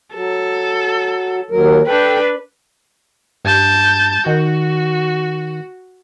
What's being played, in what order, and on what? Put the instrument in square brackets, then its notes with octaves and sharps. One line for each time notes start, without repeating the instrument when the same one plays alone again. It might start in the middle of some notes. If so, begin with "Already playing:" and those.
[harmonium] F#3 [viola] A4
[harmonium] D#2 F#3 A#4
[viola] D4 B4 [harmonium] A4 G5
[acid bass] G2 [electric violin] A5 G6
[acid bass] D#3 [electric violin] F#4